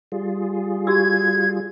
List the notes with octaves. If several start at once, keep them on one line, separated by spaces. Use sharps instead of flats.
G3 F4 G#4
F#4 G4 E6 G#6